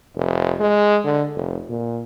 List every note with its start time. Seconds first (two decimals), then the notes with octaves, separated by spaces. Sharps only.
0.16 F1
0.60 G#3
1.05 D3
1.36 F1
1.70 A#2